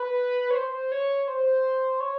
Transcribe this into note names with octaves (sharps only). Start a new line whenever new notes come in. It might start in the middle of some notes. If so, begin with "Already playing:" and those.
Already playing: B4
C#5
C5
C#5
C5
C#5